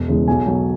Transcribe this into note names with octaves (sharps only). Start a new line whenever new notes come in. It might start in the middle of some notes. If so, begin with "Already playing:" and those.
Already playing: E1
E2 C#3 E3 G#3
B1 G#5
B2 F#3